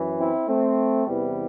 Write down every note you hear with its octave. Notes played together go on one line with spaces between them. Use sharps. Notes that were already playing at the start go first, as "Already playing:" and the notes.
Already playing: F#2 E3
C4 E4
A3 C4
E2 C3 E3 G3 B3